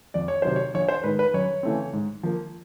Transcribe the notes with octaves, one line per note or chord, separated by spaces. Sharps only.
F2 D5
C#5
C3 D#3 F#3 C5
C#5
A#1 C#5
C5
G#2 D#3 G#3 B4
B4
F#2 C#5
C#3 E3 A3 C4
G#2
F3 A#3